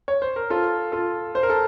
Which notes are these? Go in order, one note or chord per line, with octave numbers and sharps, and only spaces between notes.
C#5
C5
A#4
F4 A4
F4 A4
C5
A#4
A4